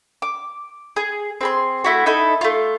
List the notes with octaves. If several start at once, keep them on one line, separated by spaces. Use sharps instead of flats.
D6
G#4
C4 G#4 C6
A3 E4 F#4
D#4 E4 A4
A3 F4